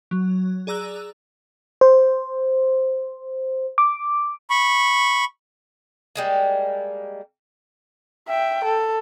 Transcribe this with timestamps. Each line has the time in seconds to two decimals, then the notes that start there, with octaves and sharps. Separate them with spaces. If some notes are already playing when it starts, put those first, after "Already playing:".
0.11 F#3
0.67 G#4 D5 A#5 E6 F#6
1.81 C5
3.78 D6
4.50 B5 C#6
6.16 G3 G#3 A#3
8.28 E5 G5
8.65 A4